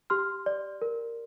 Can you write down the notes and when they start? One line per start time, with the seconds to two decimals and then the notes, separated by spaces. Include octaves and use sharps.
0.10 G4 C6 F6
0.46 D5
0.82 A#4